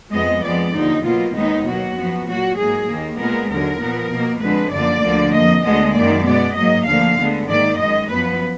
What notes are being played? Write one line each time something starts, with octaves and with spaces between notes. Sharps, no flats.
F2 F3 G#3 B3 D#5
F2 F3 G#3 B3 D5
D#2 D3 F3 D#4
B2 F#3 A#3 F4
D#2 D#3 G#3 B3 D#4
B2 F#3 A#3 F#4
F#2 F3 B3
A#2 F#3 A#3 F#4
G#2 F#3 A#3 G#4
D#2 D#3 A#3
A#2 G#3 B3 A#4
D#2 D3 F#3 A#4
A#2 F3 B3
B2 A#3
F2 D3 G#3 B4
F#2 D3 F3 A#3 D5
D2 D3 F3 A#3
F2 F3 A#3 D#5
D2 D3 G#3 B3 D#5
F#2 D#3 A#3 D5
B2 G#3 B3 D5
G#2 F#3 A#3 D#5
D2 D3 F3 A#3 F5
D2 D3 G#3 B3
G#2 D#3 A#3 D5
F#2 D#3 G#3 D#5
F#2 F3 B3 B4